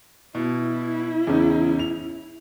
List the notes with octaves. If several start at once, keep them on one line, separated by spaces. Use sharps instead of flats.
B2 E4
E2 C#3 C#4
F7